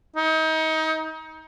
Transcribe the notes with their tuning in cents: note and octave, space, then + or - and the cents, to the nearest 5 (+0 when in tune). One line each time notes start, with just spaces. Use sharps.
D#4 +30